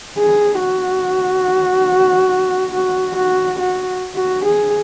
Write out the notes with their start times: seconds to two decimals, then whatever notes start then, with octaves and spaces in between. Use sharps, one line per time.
0.18 G#4
0.60 F#4
2.74 F#4
3.16 F#4
3.59 F#4
4.16 F#4
4.45 G#4